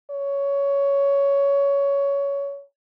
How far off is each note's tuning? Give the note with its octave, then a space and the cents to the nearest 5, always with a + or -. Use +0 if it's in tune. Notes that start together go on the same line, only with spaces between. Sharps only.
C#5 +15